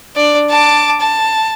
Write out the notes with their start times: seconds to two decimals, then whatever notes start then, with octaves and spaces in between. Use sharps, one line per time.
0.16 D4 D5
0.50 A5 D6
1.01 A5